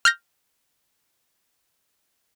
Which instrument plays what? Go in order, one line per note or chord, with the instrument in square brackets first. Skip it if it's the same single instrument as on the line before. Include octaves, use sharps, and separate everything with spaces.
[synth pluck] F6 G6 A#6